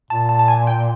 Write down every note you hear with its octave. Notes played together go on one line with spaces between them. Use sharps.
A#2 A5
A5
A5
G#5
G5